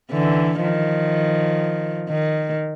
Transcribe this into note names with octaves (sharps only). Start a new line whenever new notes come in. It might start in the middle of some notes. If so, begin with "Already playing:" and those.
D3 E3
D#3 F3
D#3